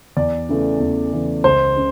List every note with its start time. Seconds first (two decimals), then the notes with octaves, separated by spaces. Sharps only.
0.17 E2 D5
0.49 C#3 E3 A3
0.80 E2
1.12 C#3 E3 A3
1.44 C#2 C5
1.76 C#3